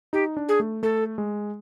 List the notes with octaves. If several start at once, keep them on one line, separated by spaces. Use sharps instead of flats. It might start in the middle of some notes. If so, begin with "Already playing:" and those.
D#4 G4
D4
G#4
A3
A3 A4
G#3